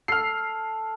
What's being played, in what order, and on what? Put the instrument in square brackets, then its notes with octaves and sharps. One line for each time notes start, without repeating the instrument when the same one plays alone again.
[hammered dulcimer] A4 [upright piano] F6 C7